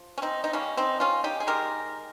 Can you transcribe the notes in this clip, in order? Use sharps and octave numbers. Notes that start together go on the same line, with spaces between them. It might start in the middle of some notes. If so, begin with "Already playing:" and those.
Already playing: F3
C#4
C4 D#4
D#4
D#3 G3 A#3 C#4
C4 D#4
C#4 F4
D#4 G4
G#4
D#3 G#3 G4 A#4